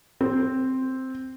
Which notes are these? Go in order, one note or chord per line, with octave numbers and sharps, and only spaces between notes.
C4